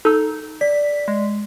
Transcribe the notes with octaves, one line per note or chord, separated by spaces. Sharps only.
D#4 A4 E6
D5 B6
G#3